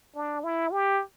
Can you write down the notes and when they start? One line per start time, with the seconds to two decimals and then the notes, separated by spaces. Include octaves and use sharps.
0.16 D4
0.44 E4
0.72 G4